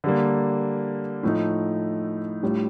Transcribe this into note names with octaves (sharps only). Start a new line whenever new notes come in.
D3 G3 A#3
A2 F3 A3 D#4
A2 G3 D4 F4